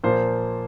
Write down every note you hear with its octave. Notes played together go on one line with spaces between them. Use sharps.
A#2 F3 A#3 C5